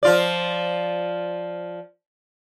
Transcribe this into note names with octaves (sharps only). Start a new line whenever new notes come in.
F3 F4 D5